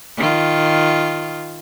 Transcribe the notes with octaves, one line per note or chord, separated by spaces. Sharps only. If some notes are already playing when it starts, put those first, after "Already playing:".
D#3 F4